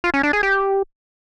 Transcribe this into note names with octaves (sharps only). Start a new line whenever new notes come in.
F4
C#4
D4
G#4
G4